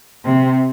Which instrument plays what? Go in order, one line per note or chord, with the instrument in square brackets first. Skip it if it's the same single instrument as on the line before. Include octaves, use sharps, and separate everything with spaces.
[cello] C3